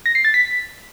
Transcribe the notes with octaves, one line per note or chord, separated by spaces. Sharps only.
A#6
C7
A6
B6